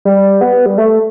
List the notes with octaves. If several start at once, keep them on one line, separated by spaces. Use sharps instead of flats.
G3
B3
G3
A3